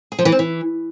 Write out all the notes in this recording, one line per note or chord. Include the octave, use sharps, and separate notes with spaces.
G#4
F3
E3
C4
E3